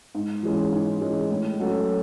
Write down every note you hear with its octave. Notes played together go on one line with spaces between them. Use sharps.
G#2
E3 G#3 C#4
G#2
E3 G#3 C#4
A2
F#3 C#4 F#4 A4